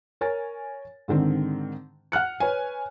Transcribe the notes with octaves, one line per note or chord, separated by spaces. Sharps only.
A#4 C#5 G#5 A6
G#2 D3 D#3 C4
F#5 F6 F#6 C#7
B4 C#5 G#5